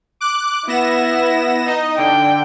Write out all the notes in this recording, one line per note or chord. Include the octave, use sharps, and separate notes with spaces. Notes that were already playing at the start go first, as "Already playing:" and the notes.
D6 F#6
B3 E4 A#6 E7
D#4 D#5
D3 G5